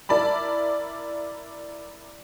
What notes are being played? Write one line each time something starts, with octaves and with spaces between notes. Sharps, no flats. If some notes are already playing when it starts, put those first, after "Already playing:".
E4 A#4 D5 A5 B5